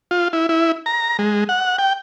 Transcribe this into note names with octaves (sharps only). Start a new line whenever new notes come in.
F4
E4
E4
A#5
G#3
F#5
G5